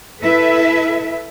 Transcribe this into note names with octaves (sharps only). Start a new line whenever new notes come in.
E4 A4 B4 E5